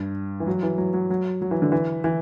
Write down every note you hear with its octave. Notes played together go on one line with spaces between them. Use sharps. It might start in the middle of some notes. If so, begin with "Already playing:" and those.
Already playing: G2
E3
F#3
E3
F#3
F#3
F#3
F#3
E3
D3
E3
E3